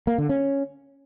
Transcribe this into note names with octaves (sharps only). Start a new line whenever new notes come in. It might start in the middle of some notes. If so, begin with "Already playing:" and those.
A#3
D3
C#4